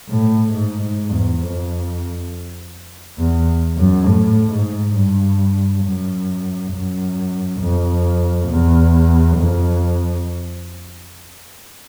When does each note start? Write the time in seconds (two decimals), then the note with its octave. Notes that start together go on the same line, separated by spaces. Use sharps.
0.09 A2
0.53 G#2
0.82 G#2
1.12 E2
1.42 F2
3.18 E2
3.77 F#2
4.07 A2
4.51 G#2
4.95 G2
5.84 F#2
6.72 F#2
7.60 F2
8.49 E2
9.37 F2